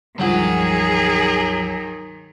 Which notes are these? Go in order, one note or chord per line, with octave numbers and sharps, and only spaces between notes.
C#2 G2 D#3 F3 F#3 G#4 F#5